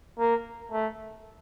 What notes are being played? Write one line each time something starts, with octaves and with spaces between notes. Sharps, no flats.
A#3
A3